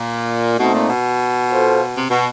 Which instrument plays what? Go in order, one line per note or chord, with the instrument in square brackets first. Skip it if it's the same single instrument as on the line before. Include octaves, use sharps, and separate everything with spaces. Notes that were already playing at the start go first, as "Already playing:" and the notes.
Already playing: [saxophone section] A#2
[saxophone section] B2 [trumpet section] A3 C4 D#4
[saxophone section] A#2
B2
[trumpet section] F4 A4 C5 F5
[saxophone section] C3
B2